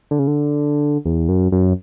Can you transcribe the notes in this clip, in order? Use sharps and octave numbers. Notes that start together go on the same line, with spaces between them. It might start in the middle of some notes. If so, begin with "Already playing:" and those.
D3
C#3
D3
E2
F#2
F#2